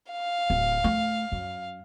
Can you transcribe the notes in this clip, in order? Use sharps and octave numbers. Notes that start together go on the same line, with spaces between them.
F5
D1
A3
F#2